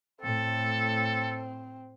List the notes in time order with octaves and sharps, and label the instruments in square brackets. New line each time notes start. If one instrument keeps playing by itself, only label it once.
[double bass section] A2 [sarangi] C4 [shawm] A4